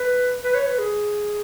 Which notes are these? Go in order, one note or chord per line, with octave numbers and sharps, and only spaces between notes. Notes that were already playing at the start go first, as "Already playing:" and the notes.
Already playing: B4
B4
C#5
B4
G#4